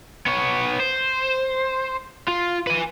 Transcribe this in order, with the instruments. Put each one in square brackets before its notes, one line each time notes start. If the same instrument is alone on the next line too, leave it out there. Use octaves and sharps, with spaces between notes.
[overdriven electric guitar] B3 C#5
C5
F4
B4 G#5